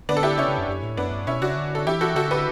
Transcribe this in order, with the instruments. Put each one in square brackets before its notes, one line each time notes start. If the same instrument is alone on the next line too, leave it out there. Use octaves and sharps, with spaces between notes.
[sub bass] D3 [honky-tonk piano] B3 D4
[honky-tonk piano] A4
E4 G4
[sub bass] C#3 [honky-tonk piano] C#4 E4
[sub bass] C#3
F#2
F#2
A2
[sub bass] F#2 [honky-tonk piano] B3 D4
[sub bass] G2
[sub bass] B2 [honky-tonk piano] C#4 E4
[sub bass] C#3 [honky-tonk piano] D4 F#4
[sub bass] D3
[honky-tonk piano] A4
[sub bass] E3 [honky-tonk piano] E4 G4
[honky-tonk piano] F#4 A4
[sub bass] D3 [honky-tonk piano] F#4 A4
[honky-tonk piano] G4 B4